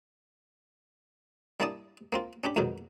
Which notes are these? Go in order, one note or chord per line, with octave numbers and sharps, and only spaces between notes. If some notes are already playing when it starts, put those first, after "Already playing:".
G3 A#3 E4 D5 A5 D#6
A#3 C4 F4
C#4 D4 G4 B5
F2 G#2 B2 D#3 F#3